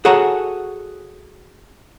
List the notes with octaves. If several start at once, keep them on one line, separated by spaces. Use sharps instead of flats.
F#4 G#4 A4 C#5 F#5 A#5